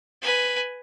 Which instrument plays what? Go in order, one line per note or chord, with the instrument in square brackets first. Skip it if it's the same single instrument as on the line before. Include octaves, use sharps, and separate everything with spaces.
[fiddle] B4 G#5